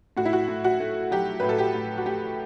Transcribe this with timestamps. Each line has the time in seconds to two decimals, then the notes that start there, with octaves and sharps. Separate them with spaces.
0.17 A2 F#4
0.25 E4
0.33 F#4
0.48 A2
0.64 F#4
0.80 A3
1.11 F#3 G4
1.40 A2 B4
1.49 A4
1.59 G4
1.75 A2
1.98 F#4
2.06 A3 G4